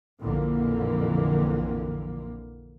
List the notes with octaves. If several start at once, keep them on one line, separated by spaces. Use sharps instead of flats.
A#1 F2 D3 E3 A#3